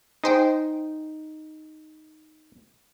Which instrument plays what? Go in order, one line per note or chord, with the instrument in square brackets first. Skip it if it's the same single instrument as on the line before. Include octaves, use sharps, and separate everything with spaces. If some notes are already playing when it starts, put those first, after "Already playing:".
[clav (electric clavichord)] D#4 [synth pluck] G#4 C5 G5